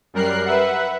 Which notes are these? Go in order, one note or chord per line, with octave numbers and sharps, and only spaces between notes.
F#2 G3 A#4 F#6 C7
B4 E5 F#5